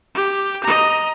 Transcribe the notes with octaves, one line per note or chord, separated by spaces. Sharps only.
G4
D#5 A#5